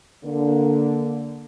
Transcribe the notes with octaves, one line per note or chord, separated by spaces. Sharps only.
D3 A#3